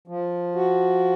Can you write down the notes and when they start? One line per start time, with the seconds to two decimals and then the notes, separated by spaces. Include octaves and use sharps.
0.07 F3
0.55 F#4